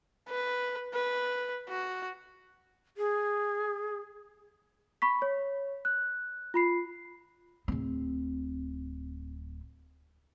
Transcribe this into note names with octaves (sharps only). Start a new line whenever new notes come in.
B4
B4
F#4
G#4
B5 C#6 B6
C#5
F#6
F4 B5 C7
D1 C4